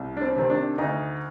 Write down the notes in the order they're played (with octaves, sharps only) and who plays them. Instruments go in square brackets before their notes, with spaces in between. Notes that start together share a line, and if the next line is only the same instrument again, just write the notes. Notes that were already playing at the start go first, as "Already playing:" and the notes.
Already playing: [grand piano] C2
D4
C4
C3 D#3 C4
D4
D2 D#4